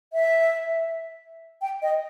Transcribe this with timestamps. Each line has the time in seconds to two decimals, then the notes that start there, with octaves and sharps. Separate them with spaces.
0.13 E5
1.61 G5
1.82 D#5